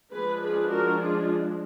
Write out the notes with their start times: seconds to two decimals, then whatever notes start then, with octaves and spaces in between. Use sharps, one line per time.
0.12 F3 G#3 D4 G#4 B4
0.42 G#4 B4
0.69 F#4 A#4
0.99 F4 G#4